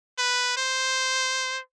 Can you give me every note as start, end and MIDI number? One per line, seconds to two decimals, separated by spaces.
0.18 0.53 71
0.57 1.60 72